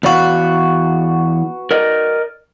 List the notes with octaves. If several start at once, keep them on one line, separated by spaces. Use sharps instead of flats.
E2 B3 F#4 D5 F5
A#4 D5 D#5